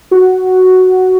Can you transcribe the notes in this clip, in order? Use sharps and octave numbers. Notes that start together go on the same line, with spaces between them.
F#4